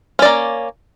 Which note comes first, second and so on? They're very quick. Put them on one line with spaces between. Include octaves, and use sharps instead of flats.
C#4 D5 A#3